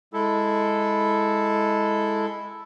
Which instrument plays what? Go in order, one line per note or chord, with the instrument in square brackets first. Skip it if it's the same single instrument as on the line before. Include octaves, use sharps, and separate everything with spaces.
[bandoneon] G#3 E4 A4